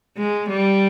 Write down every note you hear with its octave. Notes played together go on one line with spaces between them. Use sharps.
G#3
G3